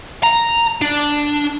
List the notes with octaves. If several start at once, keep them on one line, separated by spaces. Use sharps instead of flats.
A#5
D4